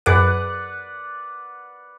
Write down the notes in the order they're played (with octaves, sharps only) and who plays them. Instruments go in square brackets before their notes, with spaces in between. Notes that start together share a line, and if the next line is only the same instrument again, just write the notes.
[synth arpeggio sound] F#2 G#4 D6 [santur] B4 D5 F#5